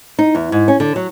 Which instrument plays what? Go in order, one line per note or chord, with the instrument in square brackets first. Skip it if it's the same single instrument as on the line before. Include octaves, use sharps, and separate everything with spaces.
[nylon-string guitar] D#4
E2
G#2
C#4
D3
F#3